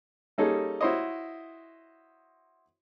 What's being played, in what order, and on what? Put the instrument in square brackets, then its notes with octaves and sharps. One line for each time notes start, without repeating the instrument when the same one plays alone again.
[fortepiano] G3 A#3 C#4 D#4 G#4 A4
E4 F#4 C5 C#5 D#5